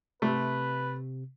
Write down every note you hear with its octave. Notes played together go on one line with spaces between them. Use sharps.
C3 A3 B4